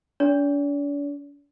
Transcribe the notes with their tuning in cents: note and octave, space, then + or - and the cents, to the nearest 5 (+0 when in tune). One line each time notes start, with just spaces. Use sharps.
D4 -45 D5 -45